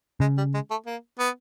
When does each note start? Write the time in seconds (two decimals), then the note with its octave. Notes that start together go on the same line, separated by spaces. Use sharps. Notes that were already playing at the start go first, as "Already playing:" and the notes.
0.20 C#3 G#3
0.37 G3
0.54 G#3
0.70 A3
0.86 A#3
1.19 B3